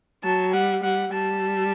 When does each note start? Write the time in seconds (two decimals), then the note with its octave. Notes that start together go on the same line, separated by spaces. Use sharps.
0.24 F#3 A5
0.53 G3 F#5
0.84 G3 F#5
1.13 G3 A5